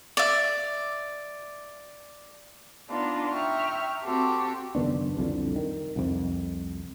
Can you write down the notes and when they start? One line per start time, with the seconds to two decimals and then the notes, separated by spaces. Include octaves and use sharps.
0.17 D5 E5
2.89 B3 D4 D#4 F4
3.30 E5 G5 A#5 C#6 F6
4.02 C4 F#4 G4 A4
4.75 F#1 D#3 B3 D4
5.17 C2 F2 D3
5.56 D#3
5.96 C2 F2